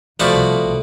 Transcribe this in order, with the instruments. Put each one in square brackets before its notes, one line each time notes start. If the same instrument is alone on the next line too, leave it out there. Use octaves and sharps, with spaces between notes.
[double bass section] C2 [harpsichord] B2 F#4 D5 [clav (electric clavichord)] F3 [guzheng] A3